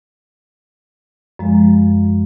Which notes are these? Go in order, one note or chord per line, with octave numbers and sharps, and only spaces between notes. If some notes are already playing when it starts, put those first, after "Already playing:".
F#2 F3 G#3